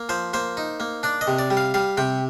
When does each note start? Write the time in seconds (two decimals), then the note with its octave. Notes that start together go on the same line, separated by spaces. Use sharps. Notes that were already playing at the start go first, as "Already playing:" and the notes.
Already playing: A#3
0.09 F3 C5
0.33 A#3 C5
0.57 D#4
0.80 A#3
1.03 D4 D5
1.21 D#5
1.27 C3
1.39 D5
1.50 G3
1.57 F5
1.74 G3 F5
1.97 C3 G5